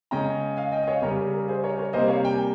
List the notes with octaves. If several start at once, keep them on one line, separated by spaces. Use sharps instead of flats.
C#3 G#3 C#4 G5 A#5
F5 G#5
D#5 G5
D#5
C#5 F5
C#3 G3 C#4 A#4 C#5
A#4
G#4
A#4
G#4 C5
A#4 C#5
A#4 C#5
C3 G3 A#3 C5 D#5
C#5 F5
G5
G#5